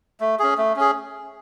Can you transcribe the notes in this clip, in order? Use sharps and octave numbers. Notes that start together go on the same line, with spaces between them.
A3
C#4 G#4
A3
C#4 G#4